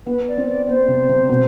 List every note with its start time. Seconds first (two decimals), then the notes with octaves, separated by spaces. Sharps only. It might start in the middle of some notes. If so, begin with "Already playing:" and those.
0.06 B3 B4
0.27 D5
0.38 C4
0.47 D5
0.67 B3 C5
0.88 C3
1.09 C3
1.29 B2